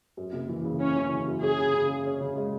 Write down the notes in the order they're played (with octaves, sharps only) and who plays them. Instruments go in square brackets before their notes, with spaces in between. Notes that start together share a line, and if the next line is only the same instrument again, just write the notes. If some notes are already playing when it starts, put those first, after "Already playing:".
[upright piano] F#2
F#1
E3
C#3
[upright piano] C#3 [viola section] C#4
[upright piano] E3
C#3
F#2
[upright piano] C#4 [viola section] G#4
[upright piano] C#3
C#3
C#3
C#4
C#3
G#3